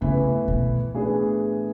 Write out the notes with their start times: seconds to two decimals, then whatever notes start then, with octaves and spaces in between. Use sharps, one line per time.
0.01 A2 C#3 E3 B3 E4 B4
0.48 B2
0.94 A2 E3 B3 D4 G#4